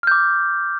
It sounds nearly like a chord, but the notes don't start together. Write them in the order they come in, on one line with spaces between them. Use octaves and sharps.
F6 G6 D6